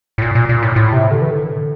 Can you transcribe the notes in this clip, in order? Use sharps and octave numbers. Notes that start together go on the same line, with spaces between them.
A2
A#2
A#2
A#2
A2
A2
C3
D3
E3
D3